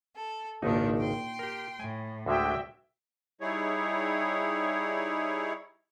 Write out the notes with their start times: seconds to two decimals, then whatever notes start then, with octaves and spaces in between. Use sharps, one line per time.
0.15 A4
0.62 G#1 C#2 A#2 D#3 D4 D#4
0.97 G5 C6
1.39 G4 A#4
1.80 A2 G#5
2.26 D2 D3 G#3 F#4 E5 G5
3.41 G3 D#4 E4 G#4 C#5